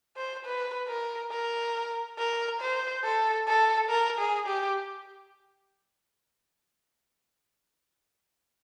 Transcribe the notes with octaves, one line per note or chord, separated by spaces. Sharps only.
C5
B4
A#4
A#4
A#4
C5
A4
A4
A#4
G#4
G4